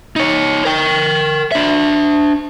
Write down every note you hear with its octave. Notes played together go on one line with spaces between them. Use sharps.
D#4 C#5
A#4 G5
D4 E5